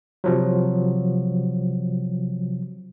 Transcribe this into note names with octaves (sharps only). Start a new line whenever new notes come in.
C3 F3 F#3